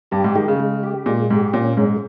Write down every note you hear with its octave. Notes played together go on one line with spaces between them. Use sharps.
G2 G4
G#2
D#3 G#3
C#3
G#3
G4
A#2 G#3
G#2 G4
A#2 C#4
G#2 G#3